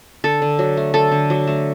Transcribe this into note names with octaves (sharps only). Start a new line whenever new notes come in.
D3 A4
D3
F#3
A3
D3 A4
D3
F#3
A3